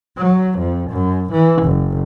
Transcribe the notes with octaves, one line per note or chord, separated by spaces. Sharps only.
F#3
F2
F#2
E3
F#1